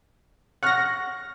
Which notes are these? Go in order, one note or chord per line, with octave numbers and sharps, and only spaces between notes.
F#5 C#6 F6 F#6 A#6